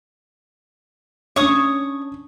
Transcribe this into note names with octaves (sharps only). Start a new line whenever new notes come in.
C#4 D4 C#5 C#6 D#6